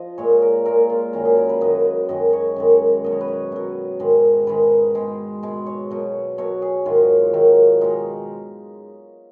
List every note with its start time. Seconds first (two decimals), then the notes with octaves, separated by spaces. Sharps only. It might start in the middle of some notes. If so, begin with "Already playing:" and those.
Already playing: F3 D#5
0.18 A#2 G#3 C#5
0.42 A#4
0.65 A#2 G#3 A#4
0.90 F4
1.13 F#2 D#3 F#3 C#4
1.25 G#4
1.37 A#4
1.49 B4
1.61 F#2 D#3 F#3 D#5
2.09 F#2 D#3 G#3 D#5
2.33 C#5
2.56 F#2 D#3 G#3
3.04 B2 F#3 D#5
3.12 C#5
3.21 B4
3.28 C#5
3.52 B2 F#3
4.00 G#2 D#3 G#3
4.47 G#2 D#3 G#3 B4
4.95 B2 G#3
5.43 B2 G#3
5.66 C#5
5.91 B2 F#3
6.38 B2 F#3 C#5
6.62 G#4
6.86 G#2 D#3 F#3 F4
7.33 G#2 D#3 F#3
7.81 B2 G#3 D#4